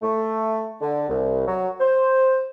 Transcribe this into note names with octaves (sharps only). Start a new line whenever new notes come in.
A3
D3
C2
F#3
C5